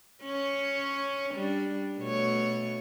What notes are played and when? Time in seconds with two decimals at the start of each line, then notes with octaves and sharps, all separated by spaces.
0.23 C#4 C#5
1.35 G3 D4
2.00 B2 A3 C#5